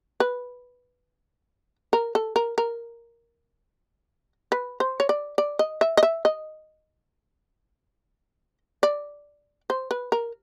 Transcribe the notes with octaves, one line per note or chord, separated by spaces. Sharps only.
B4
A#4
A4
A#4
A#4
B4
C5
C#5
D5
D5
D#5
E5
D#5
E5
D#5
D5
C5
B4
A#4